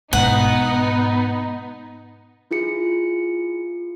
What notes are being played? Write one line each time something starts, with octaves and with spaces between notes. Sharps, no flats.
G#2 B2 B3 D#4 F#5
E4 F4 G#4 C#7